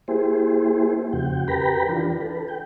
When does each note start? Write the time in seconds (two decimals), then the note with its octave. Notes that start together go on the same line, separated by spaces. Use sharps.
0.08 A#3 E4 G4 G#4 C5
1.13 F2 C#3 F#4 G5
1.48 G4 A#4 B4 G5 A#5 B5
1.88 E3 D4 F4
2.21 A4 B4
2.48 G5